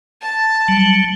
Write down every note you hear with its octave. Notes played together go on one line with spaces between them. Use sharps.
A5
F#3 G3